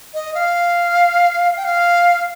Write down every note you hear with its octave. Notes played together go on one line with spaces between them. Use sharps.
D#5
F5
G5
F5